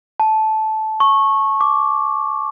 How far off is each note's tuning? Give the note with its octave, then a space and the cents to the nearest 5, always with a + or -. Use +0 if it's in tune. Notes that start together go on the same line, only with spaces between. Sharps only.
A5 -15
C#6 -15
D6 -10